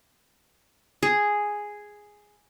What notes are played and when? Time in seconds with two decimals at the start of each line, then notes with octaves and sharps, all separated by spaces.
1.03 G#4